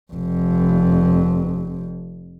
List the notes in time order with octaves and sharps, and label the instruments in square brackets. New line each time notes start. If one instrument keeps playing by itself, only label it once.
[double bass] F1 F2